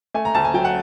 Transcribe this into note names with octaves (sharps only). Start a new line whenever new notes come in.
A3 G#5
A#5
D2 A5
G#5
F#3 G5
F#5